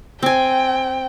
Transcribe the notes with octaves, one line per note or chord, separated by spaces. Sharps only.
C4 G5 G#5